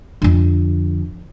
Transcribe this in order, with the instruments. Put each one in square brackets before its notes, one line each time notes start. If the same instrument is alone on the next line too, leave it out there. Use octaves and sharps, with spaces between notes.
[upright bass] F2 D3